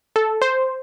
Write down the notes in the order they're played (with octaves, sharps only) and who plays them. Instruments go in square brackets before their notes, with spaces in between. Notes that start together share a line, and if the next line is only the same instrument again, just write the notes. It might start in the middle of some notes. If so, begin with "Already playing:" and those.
[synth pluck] A4
C5